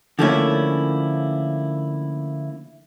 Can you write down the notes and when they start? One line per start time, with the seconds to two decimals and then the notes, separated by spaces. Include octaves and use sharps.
0.19 D3 F3 A3 A#3 C#4 E4